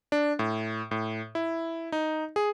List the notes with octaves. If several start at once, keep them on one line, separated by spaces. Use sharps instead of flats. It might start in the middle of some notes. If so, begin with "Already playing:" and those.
D4
A2
A2
E4
D#4
G#4